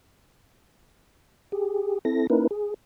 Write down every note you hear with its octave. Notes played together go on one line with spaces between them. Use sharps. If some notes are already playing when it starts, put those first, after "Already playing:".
G4 G#4
C4 E4 A4 A#6
A#3 C#4 D#4 E4 A#4 B4
G#4